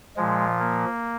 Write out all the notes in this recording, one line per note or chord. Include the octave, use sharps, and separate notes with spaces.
A#2 F3 G#3
A#3